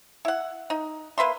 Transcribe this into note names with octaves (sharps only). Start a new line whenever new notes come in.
E4 F#5
D#4
A#3 B4 E5 C6